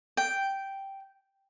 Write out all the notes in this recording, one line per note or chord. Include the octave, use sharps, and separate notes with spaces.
G5